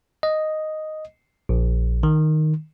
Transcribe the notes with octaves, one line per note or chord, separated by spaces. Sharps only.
D#5
A#1
D#3